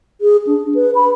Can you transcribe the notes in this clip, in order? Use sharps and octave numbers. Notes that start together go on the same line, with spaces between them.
G#4
D4
B4
B5